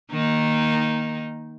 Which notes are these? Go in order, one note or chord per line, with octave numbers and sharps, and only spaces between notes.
D#3 A#3 D#4